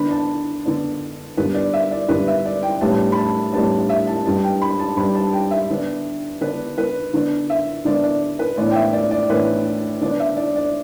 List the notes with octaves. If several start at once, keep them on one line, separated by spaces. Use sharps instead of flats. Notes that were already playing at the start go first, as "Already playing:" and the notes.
Already playing: D3 B3 D4 B5
A5
D3 B3 D4
G2 D3 B3 B4
D5
E5
D5
G2 D3 B3 B4
E5
D5
G5
A2 G3 B3 D4 A5
B5
A5
A2 G3 B3 D4 A5
E5
A5
G2 G3 D4 A5
G5
B5
A5
G2 G3 D4 B5
A5
G5
E5
D3 B3 D4
D3 B3 D4 B4
B4
D3 B3 D4
E5
D3 B3 D4 D5
D5
B4
A2 E3 B3 D4 D5
G5
E5
D5
D5
A2 E3 B3 D4 B4
D3 B3 D4 D5
E5
D5
D5